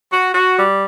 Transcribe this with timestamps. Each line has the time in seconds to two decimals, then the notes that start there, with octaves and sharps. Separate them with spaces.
0.12 F#4
0.34 F#4
0.58 G3